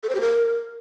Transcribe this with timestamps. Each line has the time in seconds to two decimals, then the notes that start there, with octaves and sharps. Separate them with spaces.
0.03 A4
0.09 C5
0.15 G4
0.21 A#4